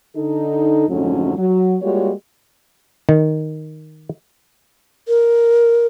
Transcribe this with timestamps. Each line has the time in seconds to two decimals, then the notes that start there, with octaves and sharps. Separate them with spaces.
0.16 D3 D#4 A4
0.88 F2 G#2 D3 F#3 A3 C#4
1.37 F#3
1.81 G3 G#3 A#3 F4 F#4 C#5
3.09 D#3
5.08 A#4